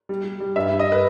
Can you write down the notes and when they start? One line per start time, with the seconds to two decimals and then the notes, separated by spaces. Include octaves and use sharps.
0.09 G3
0.25 G3
0.40 G3
0.56 G2 E5
0.71 G2
0.79 D#5
0.92 B4